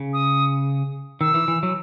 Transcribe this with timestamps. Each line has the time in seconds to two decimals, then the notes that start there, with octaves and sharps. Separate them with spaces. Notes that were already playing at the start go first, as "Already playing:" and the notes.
Already playing: C#3
0.13 D#6
1.21 D#3 E6
1.34 E3
1.48 E3
1.63 F#3